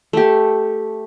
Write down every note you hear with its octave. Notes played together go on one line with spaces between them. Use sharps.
A3 G4